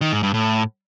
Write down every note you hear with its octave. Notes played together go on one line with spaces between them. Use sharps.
D#3
G#2
G2
A2